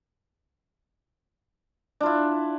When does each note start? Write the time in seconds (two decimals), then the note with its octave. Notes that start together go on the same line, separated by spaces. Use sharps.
2.01 D4
2.03 F4
2.06 E4